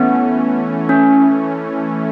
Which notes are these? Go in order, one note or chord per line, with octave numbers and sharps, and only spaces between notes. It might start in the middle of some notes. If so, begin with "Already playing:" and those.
Already playing: E3 A3 B3 C#4
C#4